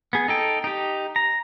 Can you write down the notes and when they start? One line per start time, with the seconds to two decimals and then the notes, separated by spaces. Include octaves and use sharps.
0.13 B3 G#4
0.28 D#4 A4 G5
0.64 D#4 G4
1.16 A#5